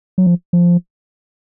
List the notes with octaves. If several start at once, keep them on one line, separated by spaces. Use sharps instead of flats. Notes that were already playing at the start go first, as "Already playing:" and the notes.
F#3
F3
F3